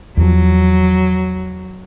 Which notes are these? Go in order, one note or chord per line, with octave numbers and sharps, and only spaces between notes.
E2 F3 F#3